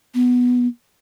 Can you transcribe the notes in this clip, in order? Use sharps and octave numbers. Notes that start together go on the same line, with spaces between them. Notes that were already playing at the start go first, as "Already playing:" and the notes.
B3